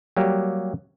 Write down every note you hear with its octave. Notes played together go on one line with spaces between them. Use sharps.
F#3 G3 A#3 G4